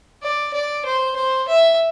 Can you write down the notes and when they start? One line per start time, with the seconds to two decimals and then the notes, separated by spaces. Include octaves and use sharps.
0.23 D5
0.54 D5
0.85 C5
1.16 C5
1.48 E5